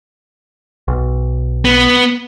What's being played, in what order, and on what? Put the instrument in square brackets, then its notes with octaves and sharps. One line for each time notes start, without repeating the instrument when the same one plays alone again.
[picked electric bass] B1
[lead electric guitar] B3